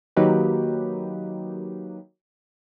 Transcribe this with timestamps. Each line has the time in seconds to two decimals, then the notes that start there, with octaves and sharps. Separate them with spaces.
0.16 D#3 F#3 A#3 D#4 G4 B4